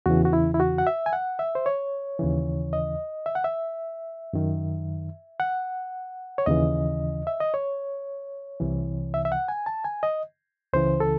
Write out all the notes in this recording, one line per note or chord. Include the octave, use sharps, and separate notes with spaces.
E2 C#3 E3 F#4
F#4
E4
E4
F#4
F#5
E5
G#5
F#5
E5
C5
C#5
D#2 C#3 E3
D#5
E5
F#5
E5
F#2 D#3
F#5
C#5
D#2 C#3 E3 D#5
E5
D#5
C#5
C2 C3 E3
E5
E5
F#5
G#5
A5
G#5
D#5
C#2 C#3 E3 C5
A4